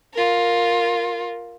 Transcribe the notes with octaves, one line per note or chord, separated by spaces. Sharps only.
F4 A#4